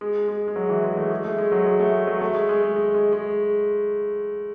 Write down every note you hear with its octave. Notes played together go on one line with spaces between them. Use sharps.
G#3
G#3
G#3
F#3
E3
G#3
A3
G#3
A3
G#3
F#3
G#3
A3
G#3
F#3
A3
G#3
G#3
G#3
G#3
G#3
G#3